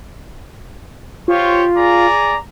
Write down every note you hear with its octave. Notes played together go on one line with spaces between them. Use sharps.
F4 G4 C5 C#5
G#4 D5 A#5